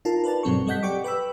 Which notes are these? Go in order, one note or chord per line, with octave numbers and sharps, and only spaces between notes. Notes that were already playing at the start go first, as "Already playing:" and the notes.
D#4 F4 A#4 A5
A#4 B4 D5 A5
G2 B2 F#3 C4 A4 C#6
G3 A4 D#5 F#5 G6 B6
G4 D5 G5 C#6 D6
B4 G5 B5 E6